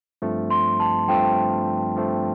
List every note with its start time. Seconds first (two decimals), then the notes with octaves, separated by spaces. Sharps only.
0.22 G2 F3 A3 C4
0.50 C6
0.80 A5
1.08 G2 F3 A3 C4 G5
1.96 G2 F3 A3 C4